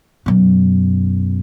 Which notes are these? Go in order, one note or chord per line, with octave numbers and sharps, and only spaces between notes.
F#2 B2